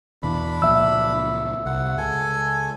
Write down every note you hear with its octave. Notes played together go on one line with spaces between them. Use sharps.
E2 B2 E3 D4 B5
C#2 A#2 F3 E5 E6
C2 F#5
C#2 A4 G#5